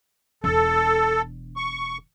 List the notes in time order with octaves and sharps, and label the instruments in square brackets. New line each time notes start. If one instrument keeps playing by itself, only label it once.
[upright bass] E1 D4 [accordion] A4
[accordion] C#6